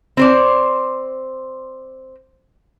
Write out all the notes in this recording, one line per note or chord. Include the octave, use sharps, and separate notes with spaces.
C4 C5 D5